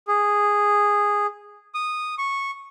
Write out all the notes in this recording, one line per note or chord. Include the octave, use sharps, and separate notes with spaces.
G#4
D#6
C#6